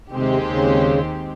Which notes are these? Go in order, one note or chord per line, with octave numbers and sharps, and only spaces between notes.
D#2 C3 D#3 G#3 C4 G4
C#3